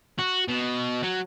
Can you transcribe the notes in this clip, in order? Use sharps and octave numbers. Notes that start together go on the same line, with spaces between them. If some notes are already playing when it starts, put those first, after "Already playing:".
F#4
B2
F#3